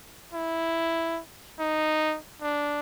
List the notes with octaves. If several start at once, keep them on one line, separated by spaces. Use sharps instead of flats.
E4
D#4
D4